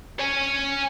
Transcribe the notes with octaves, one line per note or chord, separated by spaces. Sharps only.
C#5 G#5